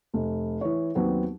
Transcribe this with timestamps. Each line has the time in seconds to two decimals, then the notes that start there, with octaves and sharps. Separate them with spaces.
0.14 F1
0.61 E3 C#5
0.95 D#2 F#3 B3 C4